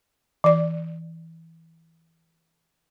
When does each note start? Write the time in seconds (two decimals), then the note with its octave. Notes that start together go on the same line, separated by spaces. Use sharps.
0.44 E3 D5